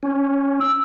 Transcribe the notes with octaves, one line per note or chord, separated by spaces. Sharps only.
C#4
E6